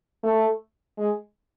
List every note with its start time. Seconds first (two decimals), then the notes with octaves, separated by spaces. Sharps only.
0.23 A3
0.98 G#3